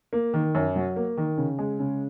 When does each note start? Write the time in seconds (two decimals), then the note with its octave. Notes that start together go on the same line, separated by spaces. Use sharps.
0.13 A#3
0.34 D#3
0.55 F#2
0.76 F#3
0.96 A#3
1.18 D#3
1.38 C#3
1.59 G#3
1.79 C#3